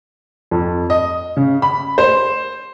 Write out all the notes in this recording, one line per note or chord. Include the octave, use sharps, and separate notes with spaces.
F2
D#5
C#3
B5
C5